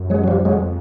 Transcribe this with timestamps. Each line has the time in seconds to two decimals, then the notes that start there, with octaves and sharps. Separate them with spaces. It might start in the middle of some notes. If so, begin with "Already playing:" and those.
Already playing: F#2
0.10 F#3 G#3
0.24 F#3
0.28 F3 G3
0.41 F#2
0.45 F2 F#3 G#3